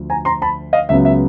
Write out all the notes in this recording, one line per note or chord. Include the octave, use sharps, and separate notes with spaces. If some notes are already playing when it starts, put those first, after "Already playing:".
Already playing: D2 D3 F3
G#5 A#5
A#5 C6
A5 B5
D#5 F5
C#2 C#3 F#3 B3 E5
E5